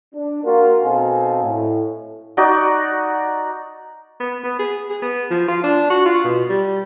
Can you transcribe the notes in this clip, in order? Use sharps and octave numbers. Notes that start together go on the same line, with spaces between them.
D4
A#3 F4 F#4 A#4
B2 C4 D#4 A4 F5 G#5
A2
D#4 F#4 D5
B3
B3
G#4
G#4
B3
F3
F4
D4
F#4
F4
B2
G3